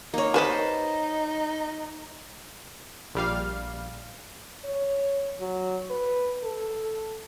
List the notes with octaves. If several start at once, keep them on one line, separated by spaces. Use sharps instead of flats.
A#3 D#4 C#5
G4 B4 C5 D#5 A5 B5
A#1 G3 F5
C#5
F#3
B4
A4